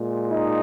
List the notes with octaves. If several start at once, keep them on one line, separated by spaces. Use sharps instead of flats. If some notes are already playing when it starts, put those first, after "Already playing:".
Already playing: A#2 G#3
D#4